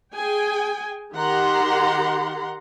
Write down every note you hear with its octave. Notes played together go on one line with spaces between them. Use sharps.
G#4 G5 G#5
D#3 G4 F#5 A#5 C6